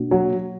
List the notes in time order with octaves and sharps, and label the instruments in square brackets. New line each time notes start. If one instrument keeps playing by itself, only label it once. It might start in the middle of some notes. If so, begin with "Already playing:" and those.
Already playing: [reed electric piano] B2 A#3 D4 F#4
[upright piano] F#3